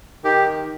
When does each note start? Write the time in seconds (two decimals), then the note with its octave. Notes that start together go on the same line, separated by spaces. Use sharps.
0.24 D#3 G4